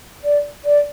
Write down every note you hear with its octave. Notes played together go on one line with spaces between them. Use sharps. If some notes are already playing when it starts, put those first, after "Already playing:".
D5
D5